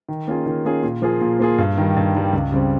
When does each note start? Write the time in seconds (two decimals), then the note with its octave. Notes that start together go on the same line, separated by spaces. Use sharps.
0.09 D#3
0.28 A#3 C#4 F4 G#4
0.46 D#3
0.65 A#3 C#4 F4 G#4
0.83 A#2
1.02 F3 A#3 F4 G#4
1.21 A#2
1.39 F3 A#3 F4 G#4
1.58 G2
1.78 D#3 G3
1.97 G2
2.15 D#3 G3
2.33 C#2
2.52 C#3 G3 C4